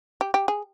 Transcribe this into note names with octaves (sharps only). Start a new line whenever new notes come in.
G4
G4
G#4